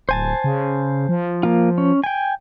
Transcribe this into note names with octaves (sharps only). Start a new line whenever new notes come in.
D1 C5 G#5 A5
C#3
F3
A#3 F4
C#4
G5 G#5